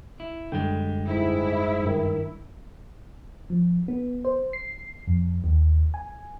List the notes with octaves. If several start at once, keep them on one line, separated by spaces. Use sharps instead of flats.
E4
F#2 D3 G3 G#3 G5
G#2 E4
G2 D#3
F3
B3
C5
C7
F2
D#2
G#5